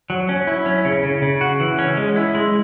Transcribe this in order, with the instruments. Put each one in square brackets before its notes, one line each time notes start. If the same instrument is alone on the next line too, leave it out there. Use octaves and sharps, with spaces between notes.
[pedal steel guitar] F#3
C#4
E4
C#4
C#3
C#3
C#3
F#4
E3
C#4
G#3
E4
G#3